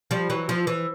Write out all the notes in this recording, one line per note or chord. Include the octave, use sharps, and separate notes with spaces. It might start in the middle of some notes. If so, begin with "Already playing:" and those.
F3 G3
E3 F#3
F3
E3